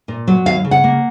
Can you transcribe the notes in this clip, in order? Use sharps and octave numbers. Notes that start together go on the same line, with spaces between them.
A#2
F#3
D#2 F5
C#3
F#5
A#3